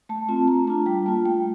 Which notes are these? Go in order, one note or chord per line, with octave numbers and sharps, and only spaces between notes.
A3 A5
C4 F4 A5
A3 A#5
D4 F4 A5
G3 G5
A#3 F4 A5
A3 G5